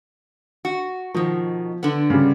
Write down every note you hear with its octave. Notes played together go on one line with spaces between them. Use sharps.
F#4
B2 D#3 F3
D3 B3
C#3 G3